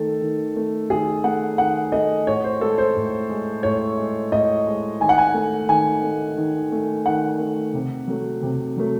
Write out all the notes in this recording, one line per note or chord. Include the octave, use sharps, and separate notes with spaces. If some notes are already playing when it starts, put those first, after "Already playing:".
Already playing: D#3 A3 A4
D#3
A3
D#3 G#4
A3 F#5
D#3 F#5
A3 D#5
A2 C#5
C5
G#3 A4
C5
A2
G#3
A2 C#5
G#3
A2 D#5
G#3
D#3 G#5
F#5
G#5
A3
D#3 G#5
A3
D#3
A3
D#3 F#5
A3
C3
F#3 A3
C3
F#3 A3